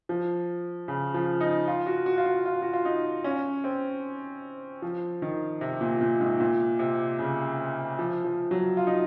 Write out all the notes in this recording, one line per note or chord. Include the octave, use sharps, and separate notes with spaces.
F3
C#3
F3
D#4
F4
F#4
F#4
F4
F#4
F4
F#4
F4
D#4
C#4
C4
F3
D#3
C3
A#2
A#2
G#2
A#2
C3
C#3
F3
F3
F#3
F4
D#4